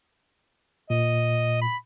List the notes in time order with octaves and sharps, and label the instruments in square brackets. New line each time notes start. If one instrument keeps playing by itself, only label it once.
[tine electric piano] A#2 [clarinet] D#5
[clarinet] B5